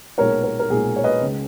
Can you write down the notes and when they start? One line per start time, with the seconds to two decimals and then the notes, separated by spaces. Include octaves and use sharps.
0.18 B1 A#2 G#3 A#4 C#5
0.44 A#4
0.59 A#4
0.70 B1 A#2 G#3 G#4
0.96 C#5
1.04 B4 D#5
1.21 C#2 C#3 G#3